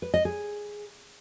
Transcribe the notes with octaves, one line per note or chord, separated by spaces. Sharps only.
B4
D#5
G#4